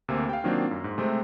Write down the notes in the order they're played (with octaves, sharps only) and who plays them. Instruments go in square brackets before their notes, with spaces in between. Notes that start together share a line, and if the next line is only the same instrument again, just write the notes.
[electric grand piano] D2 C3 A#3 C4
F5 G5
D#3 F#3 A#3 C4 D4 F4
F#2
G#2
C3 G#3 A3 C4